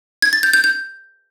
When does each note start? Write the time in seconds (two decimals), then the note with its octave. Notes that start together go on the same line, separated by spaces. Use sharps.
0.22 G#6
0.33 A6
0.43 G6
0.53 G6
0.64 G6